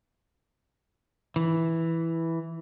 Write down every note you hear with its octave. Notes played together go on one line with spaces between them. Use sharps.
E3